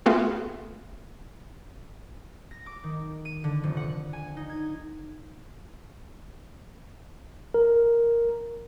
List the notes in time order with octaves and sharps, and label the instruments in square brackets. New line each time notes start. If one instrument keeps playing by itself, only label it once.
[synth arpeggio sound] A3 B3 F4 F#4 G#4 B4
[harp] A#6
D6
D#3
D#7
D3
F1
F#5
G#5
D#4
G#6
[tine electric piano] A#4